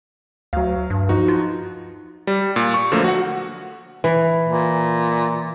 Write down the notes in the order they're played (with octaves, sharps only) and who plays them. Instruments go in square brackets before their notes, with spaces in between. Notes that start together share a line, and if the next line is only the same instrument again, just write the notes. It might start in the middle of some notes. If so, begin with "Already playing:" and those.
[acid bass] D2 [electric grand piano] F#3 F5
[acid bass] G2
[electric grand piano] F3 D#4 F#4
[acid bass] F4
[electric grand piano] G3
A#2
C#6
D3 F3 F#3 A3 A#3
F#4 F#5
[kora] E3
[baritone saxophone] A#2